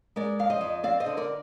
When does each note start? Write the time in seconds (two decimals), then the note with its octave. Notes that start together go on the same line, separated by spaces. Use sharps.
0.16 G#3 A#4 D5
0.39 F2 F5
0.50 C5 D#5
0.61 F2
0.83 C4 D5 F5
1.00 C5 D#5
1.06 D3
1.17 A#4 D5